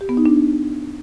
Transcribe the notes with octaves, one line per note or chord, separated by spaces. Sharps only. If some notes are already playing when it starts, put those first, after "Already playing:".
G4
B3
D#4
D4